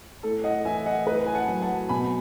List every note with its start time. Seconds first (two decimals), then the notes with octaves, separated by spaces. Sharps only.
0.23 A2 A4
0.44 D#5 F#5
0.65 E3 E5 G#5
0.86 D#5 F#5
1.06 A2 B4 D#5
1.26 G#5
1.34 F#5 A5
1.47 F#3
1.62 F#5 A5
1.89 B2 G#5 B5